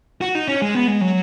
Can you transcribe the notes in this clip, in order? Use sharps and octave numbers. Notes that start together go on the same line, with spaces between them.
F#4
D#4
C#4
G#3
B3
G#3
F#3